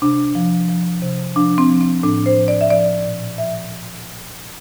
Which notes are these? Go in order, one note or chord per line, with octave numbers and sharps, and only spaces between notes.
C3 D4
F3
F3
C3
F3 D4
C4
F3
C4
A2 D4
C5
F3
D5
E5
F3 D5
A#2
F3 E5